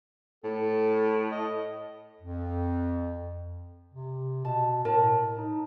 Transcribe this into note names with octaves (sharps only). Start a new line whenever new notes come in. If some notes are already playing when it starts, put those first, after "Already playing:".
A2 A4
D#5
F2
C3
B2 A5
A2 A#4 A5
D#4